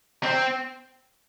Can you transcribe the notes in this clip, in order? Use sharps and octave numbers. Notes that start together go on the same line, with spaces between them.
C4